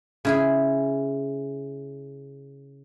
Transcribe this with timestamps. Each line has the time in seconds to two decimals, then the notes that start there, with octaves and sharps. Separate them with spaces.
0.25 C#3 E4 G#4